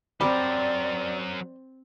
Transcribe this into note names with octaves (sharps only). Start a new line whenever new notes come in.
F#3 G3 C4 A#4 C5 D5 A5